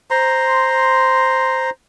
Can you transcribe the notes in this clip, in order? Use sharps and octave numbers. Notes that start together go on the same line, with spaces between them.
C5 A#5 C6